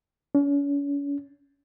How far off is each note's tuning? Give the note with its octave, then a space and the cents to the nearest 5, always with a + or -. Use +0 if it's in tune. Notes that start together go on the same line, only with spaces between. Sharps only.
C#4 +40